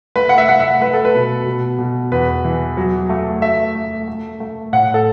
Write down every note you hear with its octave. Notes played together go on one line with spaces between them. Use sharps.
A3 B4
F#5
E5
A3 F#5
E5
A3 B4
A4
B4
B2
B2
B2
E2 B4
E3
F#3
A3
A3 E5
A3
A3
A3
A2 F#5
A4